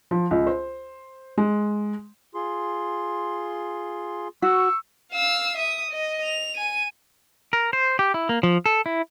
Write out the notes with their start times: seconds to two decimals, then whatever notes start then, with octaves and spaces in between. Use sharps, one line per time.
0.11 F3
0.31 C#2
0.47 C5
1.38 G#3
2.35 F4 G#4 C6
4.42 F#4 C#6 E6
5.12 F5 E6
5.56 E5 D#6
5.91 D#5
6.24 F7
6.56 G#5 D#7
7.53 A#4
7.73 C5
7.99 G4
8.14 E4
8.29 A#3
8.43 F3
8.66 A4
8.86 E4